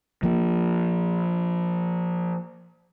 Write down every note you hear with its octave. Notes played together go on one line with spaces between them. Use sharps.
F3 A#3